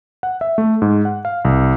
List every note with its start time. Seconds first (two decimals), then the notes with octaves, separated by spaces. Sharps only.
0.23 F#5
0.41 E5
0.58 A3
0.82 G#2
1.05 F#5
1.25 F5
1.45 C2